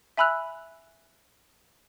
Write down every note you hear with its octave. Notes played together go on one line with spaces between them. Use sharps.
E5 G#5 B5 E6 F#6 F7